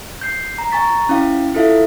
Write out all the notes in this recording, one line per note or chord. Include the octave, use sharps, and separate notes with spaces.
G6 C7
A#5
G#5 A#5 C#6 A6 B6
C#4 E4 F5
E4 F4 A4 E5 F5